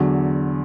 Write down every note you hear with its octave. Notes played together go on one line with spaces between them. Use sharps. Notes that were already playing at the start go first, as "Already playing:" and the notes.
Already playing: E2 D3 F#3